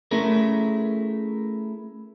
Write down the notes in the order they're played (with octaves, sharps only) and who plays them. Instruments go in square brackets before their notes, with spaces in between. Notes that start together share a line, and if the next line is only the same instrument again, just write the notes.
[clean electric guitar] A3 C#4 E4 G#4 A#4